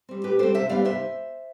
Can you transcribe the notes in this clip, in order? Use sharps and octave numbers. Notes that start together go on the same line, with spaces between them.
G3 C4
A2 G4 B4
G3 C4 A4 C5
C3 C5 E5
G3 B3 D5 F5
C3 C5 E5